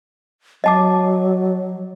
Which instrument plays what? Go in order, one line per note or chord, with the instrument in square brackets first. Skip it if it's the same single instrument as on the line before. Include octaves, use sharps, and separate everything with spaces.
[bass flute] F#3 [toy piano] D#5 A5 D6